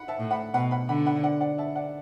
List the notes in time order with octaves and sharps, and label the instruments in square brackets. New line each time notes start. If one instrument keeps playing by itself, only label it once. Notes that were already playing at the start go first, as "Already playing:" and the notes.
Already playing: [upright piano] F#5 B5
E5 A5
[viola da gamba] A2
[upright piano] F#5 B5
[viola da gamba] B2 [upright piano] F#5 B5
[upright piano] F#5 B5
[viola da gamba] D3 [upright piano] F#5 B5
[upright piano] F#5 B5
D5 F#5
D5 F#5
E5 A5
D5 F#5